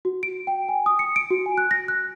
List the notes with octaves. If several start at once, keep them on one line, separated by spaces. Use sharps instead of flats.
F#4
D7
G5
G#5
D#6
C#7
D7
F#4
G#5
F#6
A#6
F#6